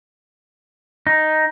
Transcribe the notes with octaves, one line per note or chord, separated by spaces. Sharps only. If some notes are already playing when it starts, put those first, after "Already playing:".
D#4